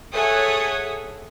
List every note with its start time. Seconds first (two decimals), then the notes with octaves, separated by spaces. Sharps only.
0.13 G#4 A4 C#5 E5 F#5 D#6